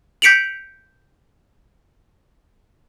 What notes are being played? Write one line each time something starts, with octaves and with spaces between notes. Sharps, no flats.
G6 B6 C#7 D7 F7 F#7